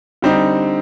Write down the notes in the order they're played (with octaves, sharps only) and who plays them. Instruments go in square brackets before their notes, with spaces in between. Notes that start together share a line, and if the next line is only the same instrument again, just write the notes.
[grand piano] D3 G3 C4 D#4